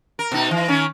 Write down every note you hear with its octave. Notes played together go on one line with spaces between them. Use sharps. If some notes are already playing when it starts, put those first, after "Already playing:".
A#4
B2 D#4
E3
D#3 C#4